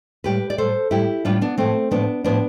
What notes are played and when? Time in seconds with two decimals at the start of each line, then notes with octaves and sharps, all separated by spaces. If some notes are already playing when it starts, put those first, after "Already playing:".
0.24 A2 G3 G4 B4
0.50 D5
0.58 A2 G3 A4 C5
0.91 A2 G3 E4 G4
1.25 A2 G3 D4 F4
1.41 B3 D4
1.58 A2 F3 A3 C4
1.91 A2 F3 B3 D4
2.24 A2 F3 B3 D4